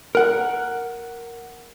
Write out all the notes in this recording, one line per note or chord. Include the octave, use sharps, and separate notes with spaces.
A#4 F#5